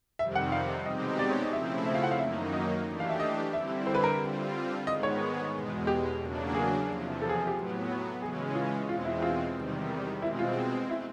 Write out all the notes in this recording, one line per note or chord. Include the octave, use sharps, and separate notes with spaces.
F2 C3 D#3 G3 C4 E5
F#5
F5
B2 G#3 C4 D#4 G4 D#5
D5
C#5
D#5
C#3 F3 A3 C4 E4 E5
E5
F5
F#5
F5
F#2 D#3 F#3 A#3 D#4 E5
D#5
E3 A3 D4 G4
F5
E5
D#5
D3 G3 C4 E4 E5
C5
B4
A#4
B4
D3 G3 C4 F4
G#2 D#3 G#3 B3 D#5
C#5
E2 B2 G#3
G4
E2 C#3 F#3 A#3 D4
G#4
E2 C3 F3
A4
G#4
G4
A2 F#3 B3
C#3 E3 G#3 C#4 G#4
F4
E2 B2 G#3 C4 F4
E4
F4
E2 C3 D#3 G3
B2 G#3 C4 E4
F4
E4